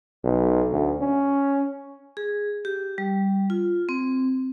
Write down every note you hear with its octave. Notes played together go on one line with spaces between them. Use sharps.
B1
D2
C#4
G#4
G4
G3
F4
C4